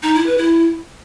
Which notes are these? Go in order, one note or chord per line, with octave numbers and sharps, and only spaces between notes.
D#4
E4
B4
E4